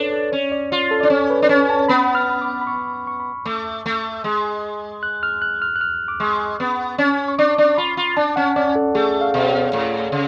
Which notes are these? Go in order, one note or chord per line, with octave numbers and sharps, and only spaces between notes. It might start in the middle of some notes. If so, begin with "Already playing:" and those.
Already playing: D4 A4 B4 C#5 D5
A4
C#4 C#5
D5
F4 D5
A4
D4 D5
C#4 C#5
B4
D4
C#4 C#5
A5
B3 B5
F6
D6
B5
C#6
B5
C#6
B5
A3 D6
A3
G#3
F#6
F6
F#6
F6
F#6
F6
D6
G#3 C#6
B3
C#4
C#6
D4 D6
D4
F4 B5
F4
D4 A5
C#4 F#5
C#4 D5
A4
A3 G#4
F5
B2
C#5
A2
C#3